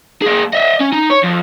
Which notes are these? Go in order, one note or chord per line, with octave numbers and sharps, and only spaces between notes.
A#3 G#4
D#5 E5
C#4
D#4
C#5
F2